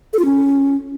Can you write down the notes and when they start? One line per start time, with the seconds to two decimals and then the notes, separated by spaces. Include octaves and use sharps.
0.13 A4
0.19 F4
0.25 C#4